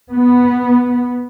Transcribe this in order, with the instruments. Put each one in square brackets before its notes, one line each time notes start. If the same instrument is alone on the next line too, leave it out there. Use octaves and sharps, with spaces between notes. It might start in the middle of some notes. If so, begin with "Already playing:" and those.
[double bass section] B3